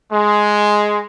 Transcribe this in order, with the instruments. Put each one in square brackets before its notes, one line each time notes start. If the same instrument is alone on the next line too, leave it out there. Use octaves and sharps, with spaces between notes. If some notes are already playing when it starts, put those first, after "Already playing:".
[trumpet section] G#3